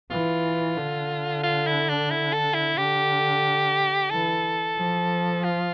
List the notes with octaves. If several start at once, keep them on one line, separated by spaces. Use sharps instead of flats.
E3 F4
D3
F4
E4
D4
E4
A4
E4
D3 G4
E3 A4
F3
F4